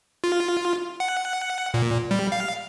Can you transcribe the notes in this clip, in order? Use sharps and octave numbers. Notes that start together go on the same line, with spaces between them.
F4
F#5
A#2
G3
F5